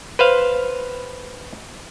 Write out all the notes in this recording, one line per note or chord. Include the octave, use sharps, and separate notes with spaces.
B4 C5 F5